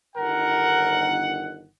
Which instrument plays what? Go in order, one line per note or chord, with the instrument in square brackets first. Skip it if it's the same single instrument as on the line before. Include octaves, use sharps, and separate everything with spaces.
[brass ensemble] G1 D#3 F#5 [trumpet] A#4